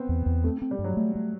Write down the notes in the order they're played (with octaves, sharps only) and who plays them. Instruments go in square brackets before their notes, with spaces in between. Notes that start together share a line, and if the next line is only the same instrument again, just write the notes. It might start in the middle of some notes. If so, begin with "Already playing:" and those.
Already playing: [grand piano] B3 C4
[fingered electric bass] E2
E2
[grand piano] A3 [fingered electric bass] C4
[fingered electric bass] C4
[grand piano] G3
[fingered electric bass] G2
[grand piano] F#3
[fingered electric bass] A3
A3